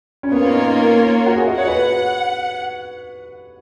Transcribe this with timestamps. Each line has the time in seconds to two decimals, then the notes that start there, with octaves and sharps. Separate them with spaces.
0.23 C#4
0.32 A#3 B3 F4 A#4 C#5
0.42 C#4
0.53 D#4
1.26 F#4
1.37 G#4
1.47 D#5
1.58 C#5 F#5
1.68 B4